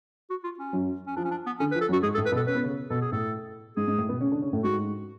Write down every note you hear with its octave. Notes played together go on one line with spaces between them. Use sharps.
F#4
F4
C#4
F#2 F#3
C#4
F3 D4
C#4
D4
B3
D3 C#4
B4
F3
A4
F#2 F#3
F#4
G#2 G#3 G#4
A4
A2 A3
B4
B2 B3
A4
C#4 B4
B3
C#3 C#4
B2 B3 A4
G#4
A2 A3 A4
G#2 G#3 G#4
G#2 G#3
A2 A3
B2 B3
C#3 C#4
D3 D4
C#3 C#4
A2 A3
G#2 G#3 F#4